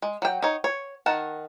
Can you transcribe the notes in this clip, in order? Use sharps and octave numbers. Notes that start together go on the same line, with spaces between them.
G#3
F#3 G5
D#4 C#5
C#5
D#3 A#4 F#5 A5